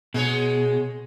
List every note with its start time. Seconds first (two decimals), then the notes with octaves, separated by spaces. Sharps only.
0.14 B2 G#3 G#4 C#5